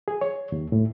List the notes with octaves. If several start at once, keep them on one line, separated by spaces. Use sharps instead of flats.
G#4
C#5
D#2
A2